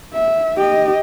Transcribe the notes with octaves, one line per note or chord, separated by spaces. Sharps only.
E5
G4 D#5